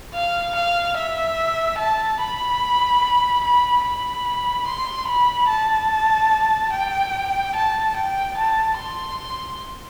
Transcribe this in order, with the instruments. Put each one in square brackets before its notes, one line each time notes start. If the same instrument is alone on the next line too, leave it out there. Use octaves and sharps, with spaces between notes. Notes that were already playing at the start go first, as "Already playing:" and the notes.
[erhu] F5
F5
E5
A5
B5
B5
B5
C6
B5
A5
G5
A5
G5
A5
C6